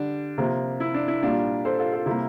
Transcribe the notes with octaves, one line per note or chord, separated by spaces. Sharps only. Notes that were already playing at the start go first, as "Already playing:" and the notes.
Already playing: D3 G3 D4
C3 F3 A#3
E4
D4
E4
A#2 G3 A#3 D4 F4
A4 C5
F4 A4
F4 A4
C3 G3 A#3 E4 G4